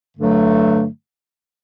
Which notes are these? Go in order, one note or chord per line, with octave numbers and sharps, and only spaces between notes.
G2 D3 F#3 A3